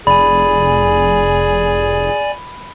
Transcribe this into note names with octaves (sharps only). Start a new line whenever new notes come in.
F1 G#4 D5 G#5 B5